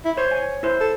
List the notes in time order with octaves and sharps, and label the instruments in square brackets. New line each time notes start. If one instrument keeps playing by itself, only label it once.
[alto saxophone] E4
[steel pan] C5 [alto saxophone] C#5
[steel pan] G#5
E4 C5
[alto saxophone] A4